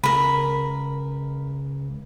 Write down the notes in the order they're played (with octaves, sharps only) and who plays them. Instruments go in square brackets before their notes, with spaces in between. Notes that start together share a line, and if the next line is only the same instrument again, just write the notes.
[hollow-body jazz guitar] C#2 [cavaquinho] A#4 B5